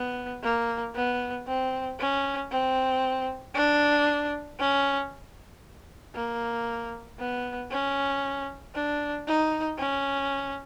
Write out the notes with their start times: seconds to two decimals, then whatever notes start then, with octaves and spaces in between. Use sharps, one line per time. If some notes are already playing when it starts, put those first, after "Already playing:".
Already playing: B3
0.43 A#3
0.95 B3
1.47 C4
1.99 C#4
2.51 C4
3.55 D4
4.59 C#4
6.15 A#3
7.19 B3
7.71 C#4
8.75 D4
9.27 D#4
9.79 C#4